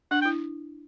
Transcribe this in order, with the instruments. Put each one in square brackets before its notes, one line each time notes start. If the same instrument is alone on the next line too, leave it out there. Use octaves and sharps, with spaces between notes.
[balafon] D4 [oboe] F#5
[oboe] G5
[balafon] E4